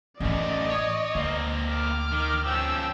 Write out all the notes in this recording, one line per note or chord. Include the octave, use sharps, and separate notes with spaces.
A1 F#2 E3 A3 D5 D#5
C#5
D2 A#3 C4
D6 F6
D#3
F3 C#4 G5 E6